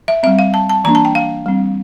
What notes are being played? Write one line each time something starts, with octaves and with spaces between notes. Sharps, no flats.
E5
G3 C4 E5
F5
A5
A5
E3 A#3 D4 A#5
A5
G5
F5
G3 C4